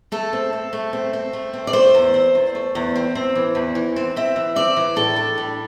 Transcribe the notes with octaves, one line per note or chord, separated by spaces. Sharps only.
A3 A4
C4
C4
A3
C4
C4
A3
C4
D5
A3 C5
E2
C4
E2
A3
E2
C4
C4
E3
E2
E3
C4
C4 E5
E3
C4 D5
E3
A2 A4
D4
G3